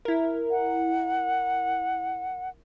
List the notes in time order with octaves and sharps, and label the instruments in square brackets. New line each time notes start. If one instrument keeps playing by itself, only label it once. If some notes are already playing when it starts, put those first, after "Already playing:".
[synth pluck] E4 A#4
[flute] F#5